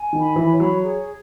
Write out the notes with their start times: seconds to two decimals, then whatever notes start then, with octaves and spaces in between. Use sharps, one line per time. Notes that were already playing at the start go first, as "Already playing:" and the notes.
Already playing: G#5
0.13 D#3
0.20 B5
0.36 E3
0.52 C#5
0.60 F#3
0.83 G#4